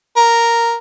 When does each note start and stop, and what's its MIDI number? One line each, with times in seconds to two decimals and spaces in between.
0.17 0.75 70